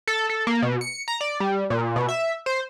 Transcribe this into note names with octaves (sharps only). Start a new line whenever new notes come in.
A4
A4
A#3
B2
C#7
A#5
D5
G3
A#2
B2
E5
C5